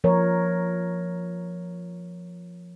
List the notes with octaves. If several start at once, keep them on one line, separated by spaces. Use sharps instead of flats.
F3 A#4 C#5